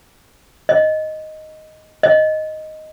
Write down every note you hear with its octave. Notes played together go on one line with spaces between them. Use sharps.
D#5
D#5